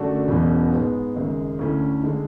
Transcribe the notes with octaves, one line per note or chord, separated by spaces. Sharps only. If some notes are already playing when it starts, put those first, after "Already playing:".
Already playing: F#2 D3 A3 D4 F#4
E1 E2 B2 F#3 C#4
G#2 G#3 B3
G#1 F#2 C#3 G#3
D2 D3 A3 C#4 E4
D3 G#3